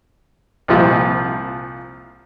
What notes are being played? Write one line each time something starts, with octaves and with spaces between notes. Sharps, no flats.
C2 A#2 F3